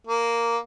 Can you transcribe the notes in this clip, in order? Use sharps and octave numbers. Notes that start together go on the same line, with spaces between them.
A#3